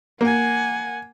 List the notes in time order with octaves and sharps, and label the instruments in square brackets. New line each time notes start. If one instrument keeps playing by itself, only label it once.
[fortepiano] A#3 [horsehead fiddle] F#5 G#5